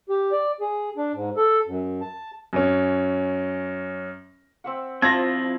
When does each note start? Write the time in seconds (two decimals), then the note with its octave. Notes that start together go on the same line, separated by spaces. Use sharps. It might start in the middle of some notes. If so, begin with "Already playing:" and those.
0.09 G4
0.32 D5
0.60 G#4
0.97 D4
1.13 G#2
1.36 A4
1.66 F#2
2.01 A5
2.53 F#2 C#4
4.64 C4 E5 F#5
5.02 F3 C4 E4 F4 A5 G#6 A#6